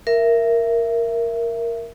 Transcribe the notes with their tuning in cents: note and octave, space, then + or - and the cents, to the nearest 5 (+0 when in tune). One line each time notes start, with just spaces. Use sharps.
A#4 +0 E5 +20